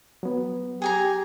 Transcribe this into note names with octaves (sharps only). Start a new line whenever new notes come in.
F#3 B3
G4 G#4 G#5 A#5